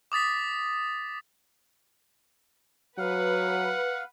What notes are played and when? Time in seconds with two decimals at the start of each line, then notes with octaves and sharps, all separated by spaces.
0.12 D6 D#6 A6 B6
2.99 F#3 B4 F5 F#5